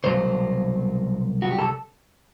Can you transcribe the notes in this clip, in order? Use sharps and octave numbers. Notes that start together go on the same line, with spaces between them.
C2 B2 F#3 C5
F#4
G4
A4